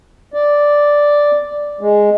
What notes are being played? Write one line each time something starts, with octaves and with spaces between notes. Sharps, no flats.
D5
G#3